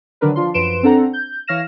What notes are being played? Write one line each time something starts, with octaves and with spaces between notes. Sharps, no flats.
D3 D#3 F#3 D4 A#4 B4
F3 D4 F4 C6
F#2 F3 B4 C6 D7 E7
C4 D4 A4 F#5 A#5
G6
E3 C#5 F5 F6 A#6 E7